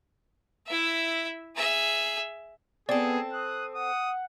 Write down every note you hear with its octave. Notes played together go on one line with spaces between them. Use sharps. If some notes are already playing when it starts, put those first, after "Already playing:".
E4 E5
G#4 E5
B3 C4 G#4 A4 D5
D#6 F#6
F#5 D#6